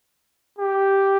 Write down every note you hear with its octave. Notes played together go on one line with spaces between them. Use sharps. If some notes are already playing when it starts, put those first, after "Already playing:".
G4